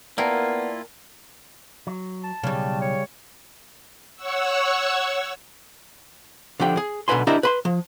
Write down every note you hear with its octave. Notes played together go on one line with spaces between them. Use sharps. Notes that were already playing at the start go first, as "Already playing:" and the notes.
A#3 B3 E4 F4 A#4 D5 G5 A5
F#3
A5
B1 C#3 G3
C#5
C#5 F#5 C#6 E6
D3 F3 G4 G5
G#4
B1 B2 D3 B4 G#5 C6
D4 E4 G4 A#4 D#5 E5
B4 B5 C6
F3